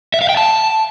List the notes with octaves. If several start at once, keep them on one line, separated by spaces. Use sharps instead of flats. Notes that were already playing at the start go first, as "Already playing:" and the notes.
E5
F5
G5
A5